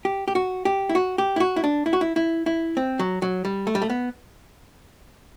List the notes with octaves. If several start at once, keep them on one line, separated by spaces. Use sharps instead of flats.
G4
G4
F#4
G4
E4
F#4
G4
E4
F#4
E4
D4
E4
F#4
E4
E4
E4
C4
F#3
F#3
G3
A3
G3
A3
B3